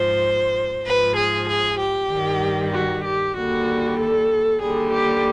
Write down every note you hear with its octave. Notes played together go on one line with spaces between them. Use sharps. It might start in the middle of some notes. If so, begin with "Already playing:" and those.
Already playing: G#2 F3 C5
G#2 F3 B4
G#4
G#4
G4
G2 D#3 G3
F#4
G4
D#2 D3 G3 F#4
A4
D#2 D3 G3 G#4
G4